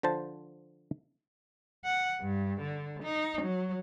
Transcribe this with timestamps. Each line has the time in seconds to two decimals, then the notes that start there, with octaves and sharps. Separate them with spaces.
0.03 D3 F3 C5 A5
1.85 F#5
2.21 G2
2.61 D3
3.03 D#4
3.42 F#3